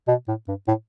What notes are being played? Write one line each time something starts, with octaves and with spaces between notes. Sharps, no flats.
B2
A2
G2
A2